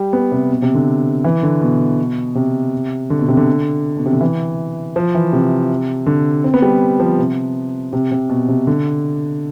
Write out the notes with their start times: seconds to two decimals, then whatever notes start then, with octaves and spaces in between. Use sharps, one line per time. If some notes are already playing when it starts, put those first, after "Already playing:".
Already playing: G3
0.13 B3
0.32 C3
0.50 B2
0.62 C3
0.75 D3
1.24 E3
1.43 D3
1.61 B2
2.35 C3
3.10 D3
3.19 B2
3.28 C3
3.37 D3
3.97 B2
4.06 C3
4.13 D3
4.21 E3
4.96 F3
5.15 E3
5.32 C3
6.06 D3
6.44 C4
6.54 B3
6.62 G3
7.00 F3
7.19 C3
7.93 C3
8.11 C3
8.29 B2
8.48 C3
8.67 D3